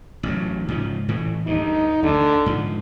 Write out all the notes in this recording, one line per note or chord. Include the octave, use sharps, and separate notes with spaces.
A1 G2 F#3
G#2 C#3 F3
A2 E3 A3
D2 G2 D#4
D2 D3
G#2 F3